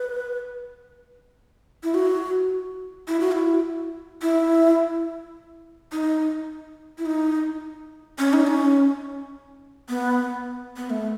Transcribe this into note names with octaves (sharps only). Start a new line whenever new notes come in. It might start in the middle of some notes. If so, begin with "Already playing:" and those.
Already playing: B4
E4
F#4
E4
F#4
E4
E4
D#4
E4
D#4
C#4
D#4
C#4
B3
B3
A3